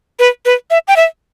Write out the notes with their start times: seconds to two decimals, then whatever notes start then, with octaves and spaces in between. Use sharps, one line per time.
0.19 B4
0.46 B4
0.71 E5
0.88 G5
0.96 E5